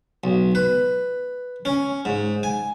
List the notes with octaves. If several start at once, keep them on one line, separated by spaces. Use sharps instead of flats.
B1
B4
C#4
G#2
G#5